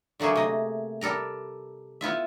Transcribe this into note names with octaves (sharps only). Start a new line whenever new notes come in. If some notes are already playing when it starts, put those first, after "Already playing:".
D3 F#3 A3 A#3 G#4
C3 D#5
G3 A4 A#4 A#5
B3 E4 F4 E5